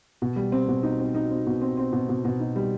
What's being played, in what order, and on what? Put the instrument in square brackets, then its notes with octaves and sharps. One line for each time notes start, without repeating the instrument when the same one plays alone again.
[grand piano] B2
G3
C4
B2
D#4
C4
D#4
C4
B2
C4
C4
B2
B2
B2
D#4
G3